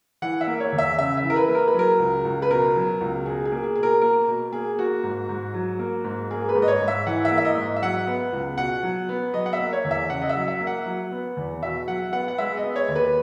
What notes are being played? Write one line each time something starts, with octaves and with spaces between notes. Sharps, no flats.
E3 F#5
E5
A#3
C#5
E2
E5
C#3 E5
E5
E3
A#4
B4
A#3
A#4
B4
F#3 A#4
C#2
C#2
B4
B2 A#4
F#3
C#2
B2 G#4
G#4
A#3
G#4
B2 G#4
A#4
A#3 A#4
B2
A#3 G#4
A#3 F#4
G#2
G#2
F#3
A#3
G#2
A#3 G#4
B4
G#2
D#5
C#5
G#2
E5
E3 F#5
E5
A#3
E5
D#5
G#2
E5
F#3 F#5
B3
C#2
B2 F#5
F#3
B3
F#3 D#5
F#5
E5
A#3
C#5
E2
E5
C#3 F#5
D#5
E5
F#3
E5
A#3
F#5
F#3
B3
E2
B2 E5
F#3 F#5
B3 F#5
F#5
G#3 E5
D#5
B3
C#5
D#2
B4